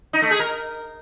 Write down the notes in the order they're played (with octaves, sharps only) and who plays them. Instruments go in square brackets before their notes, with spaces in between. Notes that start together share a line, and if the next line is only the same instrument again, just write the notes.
[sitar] D#4
A3
G#4
A#4